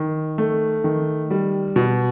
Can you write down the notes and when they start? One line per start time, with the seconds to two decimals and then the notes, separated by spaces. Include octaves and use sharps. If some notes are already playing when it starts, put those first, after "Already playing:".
Already playing: D#3
0.38 A3
0.84 D#3
1.30 G3
1.76 B2